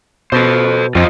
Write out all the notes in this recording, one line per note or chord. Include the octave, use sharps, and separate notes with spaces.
B2 A4 C5
F2 F4 C5 D#5